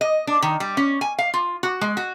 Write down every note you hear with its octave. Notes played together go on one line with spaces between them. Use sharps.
D#5
D4
D#3
G3
C#4
G#5
F5
F4
F#4
G#3
F#4